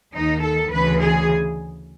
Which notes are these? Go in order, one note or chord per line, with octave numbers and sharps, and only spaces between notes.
D#2 D#3 D#4
A4
D2 C#3 E3 B4
G#4